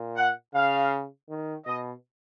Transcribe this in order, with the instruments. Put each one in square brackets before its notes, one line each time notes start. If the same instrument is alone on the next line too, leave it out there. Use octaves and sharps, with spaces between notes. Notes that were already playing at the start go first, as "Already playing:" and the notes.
Already playing: [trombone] A#2
[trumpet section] F#5
[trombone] C#3 [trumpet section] F5
[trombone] D#3
[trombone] B2 [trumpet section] D#5